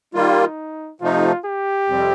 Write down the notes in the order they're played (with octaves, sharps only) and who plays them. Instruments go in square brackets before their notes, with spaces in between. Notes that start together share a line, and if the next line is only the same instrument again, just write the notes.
[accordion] D#3 G3 A#3 F4 [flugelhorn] D#4
[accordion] C3 F3 A3 D#4 [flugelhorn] F4
[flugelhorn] G4
[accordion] F2 C3 G3 C4